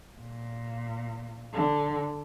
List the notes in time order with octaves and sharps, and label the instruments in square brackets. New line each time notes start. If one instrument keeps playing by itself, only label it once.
[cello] A#2
D3